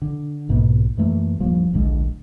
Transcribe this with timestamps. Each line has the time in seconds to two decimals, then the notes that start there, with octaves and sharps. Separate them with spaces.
0.02 D3
0.49 B1 G#2 B2 A#3
0.97 F#2 E3 A3 A#3
1.40 D1 G2 F3 A#3
1.73 D1 A#1 D3 G#3